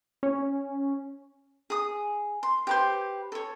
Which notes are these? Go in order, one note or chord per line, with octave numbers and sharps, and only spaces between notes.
C#4
G#4 D#6
C6
G4 B4 C5
A4 C#5